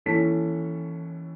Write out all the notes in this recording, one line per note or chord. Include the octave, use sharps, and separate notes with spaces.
D#2 E3 C#4 A4 A5 B6